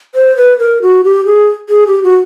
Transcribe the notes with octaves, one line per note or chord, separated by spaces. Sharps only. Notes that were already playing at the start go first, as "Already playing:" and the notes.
C5
B4
A#4
F#4
G4
G#4
G#4
G4
F#4